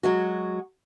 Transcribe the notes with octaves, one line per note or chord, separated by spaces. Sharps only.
F#3 G#3 F#4